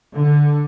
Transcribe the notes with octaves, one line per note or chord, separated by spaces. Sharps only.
D3